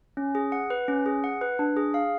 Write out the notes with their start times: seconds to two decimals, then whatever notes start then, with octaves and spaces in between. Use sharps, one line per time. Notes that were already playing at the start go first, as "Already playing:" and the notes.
0.17 C#4
0.35 G#4
0.52 F#5
0.70 B4
0.88 C#4
1.06 G#4
1.24 F#5
1.41 B4
1.59 D4
1.77 G#4
1.94 F5